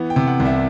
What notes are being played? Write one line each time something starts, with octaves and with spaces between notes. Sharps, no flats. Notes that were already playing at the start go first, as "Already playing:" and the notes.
Already playing: E3 B3
G5
C3
F#5
C2
E5